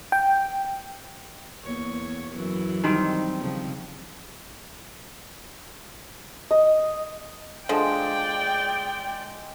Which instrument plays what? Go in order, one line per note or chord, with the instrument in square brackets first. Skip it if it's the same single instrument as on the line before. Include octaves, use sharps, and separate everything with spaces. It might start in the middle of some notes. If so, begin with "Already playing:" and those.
[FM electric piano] G5
[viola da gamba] E2 A#3 C#5
F#2 E3 F#3
[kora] D#3 G3 C4
[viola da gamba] C#3 F3
[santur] D#5
[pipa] D3 F3 [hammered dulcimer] G#3 [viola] D5 G5